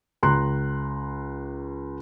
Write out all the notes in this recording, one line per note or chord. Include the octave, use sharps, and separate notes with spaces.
C#2 A#5 C6 F#6